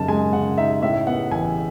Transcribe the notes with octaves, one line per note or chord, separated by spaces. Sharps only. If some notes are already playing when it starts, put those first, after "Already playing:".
Already playing: F#2 C#3 D#4 A5
G#3 G#5
C#3 F#5
D#4 E5
A2 E5
B3 F#5
A1 G#5